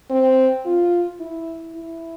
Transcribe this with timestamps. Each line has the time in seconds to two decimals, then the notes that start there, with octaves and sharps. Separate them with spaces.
0.10 C4
0.66 F4
1.20 E4
1.76 E4